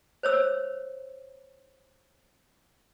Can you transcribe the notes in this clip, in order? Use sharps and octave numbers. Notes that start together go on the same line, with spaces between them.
C5 C#5 E6